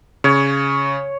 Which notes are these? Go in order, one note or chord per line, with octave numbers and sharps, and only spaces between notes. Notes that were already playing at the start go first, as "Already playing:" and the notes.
C#3 C#5